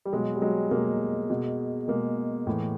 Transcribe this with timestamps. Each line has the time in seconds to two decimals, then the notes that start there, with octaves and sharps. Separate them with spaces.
0.05 G3
0.13 B2 F#3 G#3
0.35 G3
0.42 F#3 G#3
0.71 B2 G#3 A#3
1.30 B2
1.88 B2 G#3 A#3
2.47 A2 E3